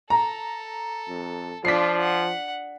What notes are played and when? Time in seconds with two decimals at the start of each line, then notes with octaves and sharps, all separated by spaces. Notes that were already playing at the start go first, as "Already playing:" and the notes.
0.10 A4 A#5
1.09 F2
1.65 F3 D4 F4 B6 C7
2.00 F#5